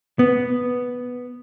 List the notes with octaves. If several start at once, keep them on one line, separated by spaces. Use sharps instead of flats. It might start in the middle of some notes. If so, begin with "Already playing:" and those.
B3